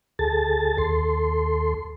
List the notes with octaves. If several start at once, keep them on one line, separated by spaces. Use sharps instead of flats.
D2 G#4 A4 A5 A6
D#2 A4 C6